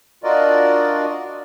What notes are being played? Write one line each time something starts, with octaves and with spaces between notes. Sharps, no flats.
D4 F4 F#4 A#4 D5 D#5